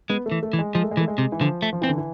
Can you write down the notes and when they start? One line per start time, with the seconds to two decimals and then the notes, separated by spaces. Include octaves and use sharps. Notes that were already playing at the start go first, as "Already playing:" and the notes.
0.10 G#3 B3
0.26 A3
0.32 E3
0.43 A3
0.53 E3
0.59 G#3
0.75 F3 G#3
0.83 A3
0.91 G#3
0.97 E3
1.00 A3
1.08 G#3
1.18 C3
1.32 E3
1.41 D3 F3
1.62 A3
1.73 F3
1.81 E3 C4
1.89 D3
1.98 E3